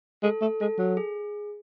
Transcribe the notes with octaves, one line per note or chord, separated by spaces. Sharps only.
G#3 A4
A3 A4
G#3 A4
F#3
G#4